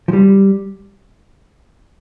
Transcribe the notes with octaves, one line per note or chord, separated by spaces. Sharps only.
F3
G3